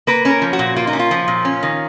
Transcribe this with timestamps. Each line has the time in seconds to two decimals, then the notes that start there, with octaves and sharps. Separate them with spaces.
0.07 A#3 B4
0.25 C#4
0.30 A#4
0.42 F3
0.53 F#4
0.59 A#2
0.76 A#3 F4
0.87 D#4
0.93 C#4
0.99 F4
1.11 F3
1.28 A#2
1.45 C#4
1.63 D#3